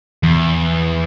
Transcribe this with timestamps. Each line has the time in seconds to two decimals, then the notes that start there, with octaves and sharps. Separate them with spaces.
0.23 E2